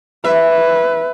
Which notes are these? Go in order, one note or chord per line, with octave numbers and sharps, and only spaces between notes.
B4 E5